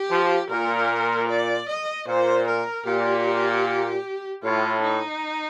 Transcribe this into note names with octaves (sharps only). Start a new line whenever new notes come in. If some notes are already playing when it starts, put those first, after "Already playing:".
Already playing: G4
F3
A#2 A#4
D5
D#5
A#2 C5
A#4
A#2 G4
A2 F4
D#4